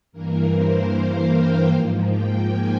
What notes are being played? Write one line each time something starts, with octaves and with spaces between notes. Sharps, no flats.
G2 E3 A#3 A#4
C5
F5
G5
G#2 F3 A#3
G5
G#5